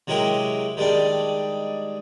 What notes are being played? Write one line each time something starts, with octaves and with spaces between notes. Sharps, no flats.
C3 F#3 G#3 E4 G4 A#4
D#3 G3 G#3 D4 D5